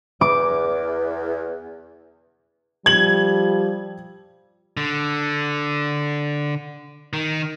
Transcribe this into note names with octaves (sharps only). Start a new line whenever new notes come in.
E2 D6
F3 G3 G#6 F#7
D3
D#3